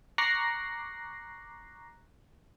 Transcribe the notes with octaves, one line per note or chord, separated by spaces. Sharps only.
A#5 C#6 D6 F#6 A#6 C7